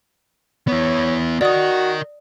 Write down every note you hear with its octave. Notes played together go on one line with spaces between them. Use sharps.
B3 E4 C#5
F#4 A#4 D5 D#5 D#6